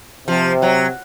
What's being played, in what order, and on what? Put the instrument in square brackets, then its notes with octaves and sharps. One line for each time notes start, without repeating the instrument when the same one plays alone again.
[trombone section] C3 [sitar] F3
[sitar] F#3